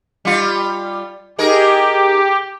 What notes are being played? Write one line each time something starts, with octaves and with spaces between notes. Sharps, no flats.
G3 F4
D#4 G4 G#4 A#4